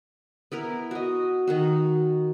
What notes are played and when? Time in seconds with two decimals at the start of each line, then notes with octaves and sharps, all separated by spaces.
0.52 B3 E4 A#4
0.91 F#4 D#5
1.47 D#3 D#4 F#4